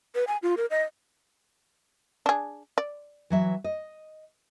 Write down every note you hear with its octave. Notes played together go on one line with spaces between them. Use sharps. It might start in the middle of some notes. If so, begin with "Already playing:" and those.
B4
G#5
F4
A#4
D#5
D4 G#4
D5
E3 F#3 E5
D#5